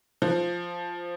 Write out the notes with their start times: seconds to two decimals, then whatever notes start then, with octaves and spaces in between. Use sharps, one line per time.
0.22 F3